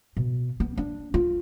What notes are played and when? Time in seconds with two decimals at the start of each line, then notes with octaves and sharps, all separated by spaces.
0.17 B2
0.60 B3
0.78 D4
1.14 F4